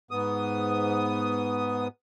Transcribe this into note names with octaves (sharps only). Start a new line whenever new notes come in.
G#2 B3 D#6